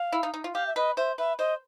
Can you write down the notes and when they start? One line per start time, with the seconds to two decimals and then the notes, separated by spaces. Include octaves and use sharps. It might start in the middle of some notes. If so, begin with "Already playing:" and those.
Already playing: F5
0.12 E4
0.23 D#4
0.34 D#4
0.44 F4
0.54 G4 F5
0.67 E5
0.76 B4 D#5
0.97 C5 E5
1.18 B4 E5
1.39 C5 D#5